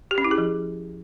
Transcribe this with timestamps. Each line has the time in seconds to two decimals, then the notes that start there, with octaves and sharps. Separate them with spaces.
0.11 G4
0.18 C#4
0.25 E4
0.31 G#4
0.38 F3